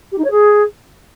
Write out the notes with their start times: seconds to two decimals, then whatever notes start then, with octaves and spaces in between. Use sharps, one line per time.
0.12 G4
0.18 D#4
0.24 C#5
0.31 G#4